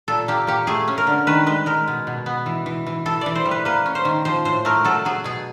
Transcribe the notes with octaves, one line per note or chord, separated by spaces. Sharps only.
A#2 A4
A#3 G4
A#3 G4
A3 G#4
C#4
A#4
D3
D#3 B4
G#3 B4
G#3 A#4
B2
B2
B3
E3
E3
E3
E3 A4
E3 D5
C5
G3
B4
A#3 B4
C#4
C5
D#3
F3 C5
A2 C5
A3 A#4
F#3 A4
F#3 G#4
B2 G#4